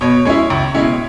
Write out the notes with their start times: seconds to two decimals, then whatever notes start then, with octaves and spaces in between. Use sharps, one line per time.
0.01 B2 C#5
0.25 G#3 C#4 E4 C#5
0.50 C#2
0.75 B2 G#3 C#4 E4